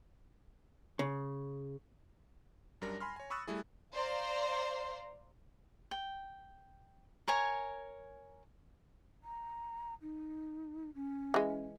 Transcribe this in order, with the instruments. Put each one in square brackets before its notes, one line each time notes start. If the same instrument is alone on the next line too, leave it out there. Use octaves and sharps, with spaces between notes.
[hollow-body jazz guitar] C#3
[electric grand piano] F#2 G3 D4 A#4 A#6
G#5 B5 C6 F6
C#5 G#5
B5 C#6 D#6 E6 F#6 A6
G3 A3 E4 G#4
[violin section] C5 D5 F5 A#5 C6
[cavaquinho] G5
A#4 C#5 G#5
[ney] A#5
D#4
C#4
[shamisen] E3 G#3